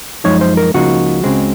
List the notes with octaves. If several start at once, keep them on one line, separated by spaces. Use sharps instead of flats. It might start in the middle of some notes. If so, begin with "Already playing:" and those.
F#2 F3 G#3 D#4 C#5
C5
A#4
C#2 C#3 F3 A#3 D#4 F#4
C#2 C#3 G#3 C4